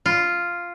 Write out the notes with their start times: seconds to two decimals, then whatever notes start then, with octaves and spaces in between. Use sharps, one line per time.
0.06 F4